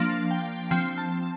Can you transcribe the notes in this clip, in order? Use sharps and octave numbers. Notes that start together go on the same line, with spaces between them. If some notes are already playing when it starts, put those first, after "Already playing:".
Already playing: F3 A#3 D4 F5
G5
F3 C4 G5
A5